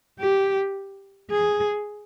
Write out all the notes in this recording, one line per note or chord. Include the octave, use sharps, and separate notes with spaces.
G4
G#4